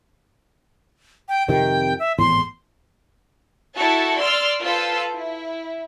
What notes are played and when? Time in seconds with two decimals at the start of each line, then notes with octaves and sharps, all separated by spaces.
1.29 G5
1.48 F2 C3 D#3 G5
1.99 E5
2.18 G#1 E2 A2 C6
3.74 E4 F#4 A4 A5
4.19 D5 C6 E6 F6
4.62 F4 A4 B4 C5 E6
5.14 E4